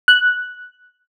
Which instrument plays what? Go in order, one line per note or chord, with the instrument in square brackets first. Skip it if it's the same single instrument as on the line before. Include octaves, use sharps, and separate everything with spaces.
[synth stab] F#6